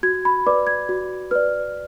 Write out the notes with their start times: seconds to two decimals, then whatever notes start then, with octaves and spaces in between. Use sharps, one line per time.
0.03 F#4 G#6
0.25 B5
0.47 B4 D5 D6
0.67 G#6
0.89 F#4
1.31 B4 D5 F6